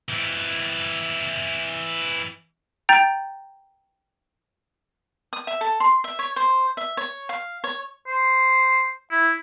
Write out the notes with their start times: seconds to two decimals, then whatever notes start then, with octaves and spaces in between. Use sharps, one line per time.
0.09 E3 C4
2.89 G5 A#5 G6 A6
5.33 D#6
5.47 E5
5.61 A4
5.80 C6
6.04 E5
6.19 C#5
6.36 C5
6.77 E5
6.97 C#5
7.29 F5
7.64 C#5
8.07 C5
9.11 E4